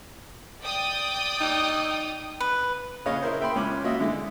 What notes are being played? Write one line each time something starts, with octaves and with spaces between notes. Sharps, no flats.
D5 G5 D#6
D#4
B4
A#1 C#3 C#5 D#5 F5
E4 A#4 C5
E5 G5 B5 C6
C#2 C#4 B5 D6
D#2 F4 F#4 D#5 E5
D3 G#3 E4